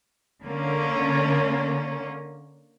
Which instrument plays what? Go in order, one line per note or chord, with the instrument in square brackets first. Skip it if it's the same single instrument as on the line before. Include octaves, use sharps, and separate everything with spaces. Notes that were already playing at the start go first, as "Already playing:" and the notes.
[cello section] D3 A#3 C#4